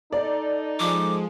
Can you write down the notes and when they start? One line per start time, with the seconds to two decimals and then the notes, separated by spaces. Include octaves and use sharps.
0.13 D#4 A4 D5
0.80 F3 G#3 D6